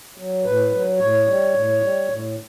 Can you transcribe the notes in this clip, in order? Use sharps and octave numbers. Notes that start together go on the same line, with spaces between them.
F#3
A2 B4
F#3
A2 C#5
G3
A2
G3
A2